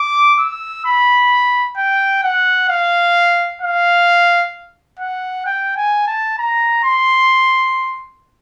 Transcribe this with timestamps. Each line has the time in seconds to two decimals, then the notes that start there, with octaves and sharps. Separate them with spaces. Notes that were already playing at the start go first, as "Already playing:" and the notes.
Already playing: D6
0.39 E6
0.85 B5
1.77 G5
2.23 F#5
2.69 F5
3.62 F5
5.00 F#5
5.46 G5
5.77 G#5
6.07 A5
6.39 A#5
6.84 C6